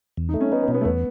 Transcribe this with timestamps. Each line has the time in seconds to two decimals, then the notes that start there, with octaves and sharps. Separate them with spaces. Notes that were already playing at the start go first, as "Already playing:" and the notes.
0.17 E2
0.29 D#4
0.34 A3
0.41 C#4
0.52 B3 D#4
0.63 B3
0.68 B2
0.74 B3
0.81 A3
0.85 E2 B3